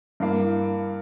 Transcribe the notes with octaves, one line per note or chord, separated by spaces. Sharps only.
G2 E3 A#3